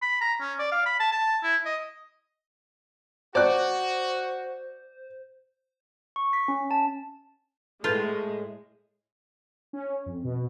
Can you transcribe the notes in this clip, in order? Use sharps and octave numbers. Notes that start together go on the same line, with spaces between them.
B5
A#5
C#4
D5
F5
B5
A5
A5
E4
D#5
F#4 C5 D5 F#6
C#6
B6
C#4
A5
A2 G#3 F4 A4 B4 G6
C#4
F2
B2